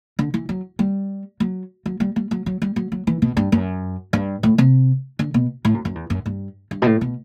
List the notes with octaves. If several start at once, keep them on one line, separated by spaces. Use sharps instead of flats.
D3
E3
F#3
G3
F#3
F#3
G3
G3
F#3
F#3
G3
F#3
F#3
E3
B2
G2
F#2
G2
A2
C3
D3
B2
A2
F#2
F#2
E2
F#2
G2
G2
B2
A2
B2